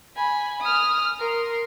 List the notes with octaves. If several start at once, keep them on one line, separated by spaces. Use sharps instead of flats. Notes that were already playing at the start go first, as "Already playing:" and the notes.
G#5 B5
D#6 F6
A#4 C6